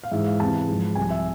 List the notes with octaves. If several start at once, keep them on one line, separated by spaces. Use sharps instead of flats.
F5
G#2 E3 E5
F5
E2 C3 E3 A5
G#2 F3
C2 C3 F3 G#5
E5